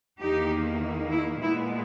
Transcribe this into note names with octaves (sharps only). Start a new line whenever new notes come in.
E2 D#3 A#3 D#4 G4
E4
A#2 G#3 B3 E4